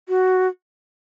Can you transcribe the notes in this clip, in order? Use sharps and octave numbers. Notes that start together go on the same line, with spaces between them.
F#4